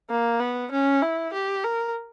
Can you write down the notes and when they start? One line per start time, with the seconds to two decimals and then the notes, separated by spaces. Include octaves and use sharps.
0.10 A#3
0.40 B3
0.72 C#4
1.03 E4
1.33 G4
1.64 A#4